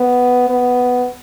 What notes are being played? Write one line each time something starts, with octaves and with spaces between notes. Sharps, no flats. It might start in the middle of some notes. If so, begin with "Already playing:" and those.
Already playing: B3
B3